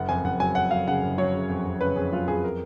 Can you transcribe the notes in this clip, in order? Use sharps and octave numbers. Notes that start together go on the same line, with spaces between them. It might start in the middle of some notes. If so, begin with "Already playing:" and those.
Already playing: F#1 F#5
F2 G#5
F#1 F#5
F#3 G#5
F2 F#5
F#3 F5
C#3 F#5
F#1
F#3 C#5
C#3
F2
F2
C#3 B4
F2 G#4
F#3 F4
F2 G#4
A#4